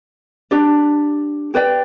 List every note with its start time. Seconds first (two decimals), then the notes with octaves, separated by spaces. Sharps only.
0.51 D4 G4 D5
1.54 G4 B4 D5 G5